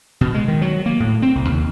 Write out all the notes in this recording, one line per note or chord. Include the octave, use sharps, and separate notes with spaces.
B2
G#3
D#3
F#3
A#3
A2
C4
C2
D#2